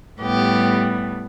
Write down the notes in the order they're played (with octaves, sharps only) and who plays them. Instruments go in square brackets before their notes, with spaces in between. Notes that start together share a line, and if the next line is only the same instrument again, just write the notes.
[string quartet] A2 G3 B3 G4